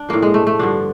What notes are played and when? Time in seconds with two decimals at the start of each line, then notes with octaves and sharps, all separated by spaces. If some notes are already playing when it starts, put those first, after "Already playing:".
Already playing: D4
0.09 A2 F3 A#3
0.22 G#3
0.34 A3
0.47 A3
0.59 G2 D3 F3 D4